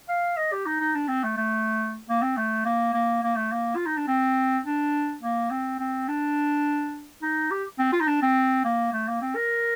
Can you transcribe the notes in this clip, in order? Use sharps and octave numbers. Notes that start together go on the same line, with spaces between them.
F5
D#5
G4
D#4
D#4
D4
C4
A3
A3
A#3
C4
A3
A#3
A#3
A#3
A3
A#3
F4
D#4
D4
C4
D4
A#3
C4
C4
D4
D#4
G4
C4
F4
D#4
D4
C4
A#3
A3
A#3
C4
A#4